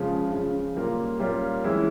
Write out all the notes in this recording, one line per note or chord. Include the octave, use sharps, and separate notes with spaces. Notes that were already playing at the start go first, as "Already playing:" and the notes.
Already playing: C#3 F3 G#3
C#3 F3 G#3
A#2 G3 A#3 C#4 F4
A#2 G3 A#3 C#4 F4
E3 G#3 C#4 E4